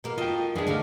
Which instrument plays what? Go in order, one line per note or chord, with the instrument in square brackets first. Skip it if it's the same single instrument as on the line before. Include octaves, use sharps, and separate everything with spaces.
[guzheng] B2 A#3
[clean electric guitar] F4 G5 [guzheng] D#5 A5
[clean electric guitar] F#2 D4 G#4 [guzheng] E3 G#3
[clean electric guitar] D2 A3 F5 [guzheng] D4 F#4 F#5